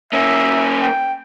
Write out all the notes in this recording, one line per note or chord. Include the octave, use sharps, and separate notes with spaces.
A#3 C#4 E5
G5